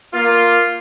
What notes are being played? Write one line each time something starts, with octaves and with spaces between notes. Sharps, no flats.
A#3 F4